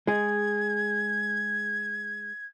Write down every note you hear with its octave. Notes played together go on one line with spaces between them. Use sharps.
G#3 G#4 G#6